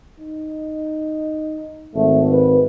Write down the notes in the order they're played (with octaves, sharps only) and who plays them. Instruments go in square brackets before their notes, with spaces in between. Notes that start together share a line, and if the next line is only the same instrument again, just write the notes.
[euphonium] D#4
[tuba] G#1 [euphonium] A3
[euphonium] B4